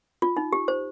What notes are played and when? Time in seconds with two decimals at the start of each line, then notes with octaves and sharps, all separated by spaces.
0.22 F4
0.37 D#4
0.53 G4
0.68 C5